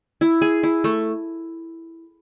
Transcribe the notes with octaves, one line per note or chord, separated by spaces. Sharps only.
E4
G#4
E4
A3